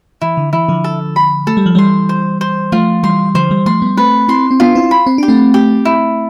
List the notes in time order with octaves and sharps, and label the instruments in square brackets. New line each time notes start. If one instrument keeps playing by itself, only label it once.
[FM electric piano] E3 [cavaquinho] E4
[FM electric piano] D3
[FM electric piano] E3 [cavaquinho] E4
[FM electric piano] D3 F3
[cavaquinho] A4
B5
[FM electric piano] A3 [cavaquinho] A4
[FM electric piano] G3
F3
[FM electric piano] E3 G3 [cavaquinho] C6
[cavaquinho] C5
C5
[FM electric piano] F3 A3 [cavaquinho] F4
[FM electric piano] E3 G3 [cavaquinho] C6
[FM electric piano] D3 F3 [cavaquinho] C5
[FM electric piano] E3 G3
[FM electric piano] F3 A3 [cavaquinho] C6
[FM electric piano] G3 B3
[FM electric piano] A3 C4 [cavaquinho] B4
[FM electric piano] C4 E4 [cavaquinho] C6
[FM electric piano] C4
[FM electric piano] B3 D4 [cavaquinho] F4
[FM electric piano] C4 E4
[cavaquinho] B5
[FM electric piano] C4
[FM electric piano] D4 [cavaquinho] G4
[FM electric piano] A3 C4
[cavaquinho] G4
E4